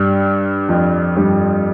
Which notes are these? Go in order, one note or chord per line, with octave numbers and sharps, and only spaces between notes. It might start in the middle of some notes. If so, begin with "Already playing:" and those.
Already playing: G2 G3
F2 F3
G2 G3